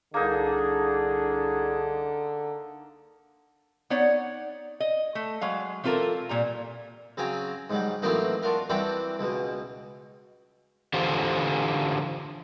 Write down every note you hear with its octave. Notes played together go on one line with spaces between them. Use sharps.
C2 D3 A#3 D4 D#4 G#4
B3 D#4 C#5 D5 F#5
D#5
A3
F#3 G#3 F5
E3 C4 F4 A4 A#4
A#2 G3 A#5
C#3 F#3 C4 G#5 A#5
G#2 F#3 G3
A2 E3 F#3 A#3 C4 D#4
D4 F4 F#4 A#4
E3 G3 C4 D4 F#4 G4
C#2 B2
D3 E3 F4 G4 C5